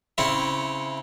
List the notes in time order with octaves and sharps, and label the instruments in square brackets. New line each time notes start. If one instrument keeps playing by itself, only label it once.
[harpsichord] C#3 C4 C#4 E4